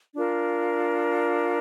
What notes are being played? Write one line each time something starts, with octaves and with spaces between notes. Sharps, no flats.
D4 F4 A#4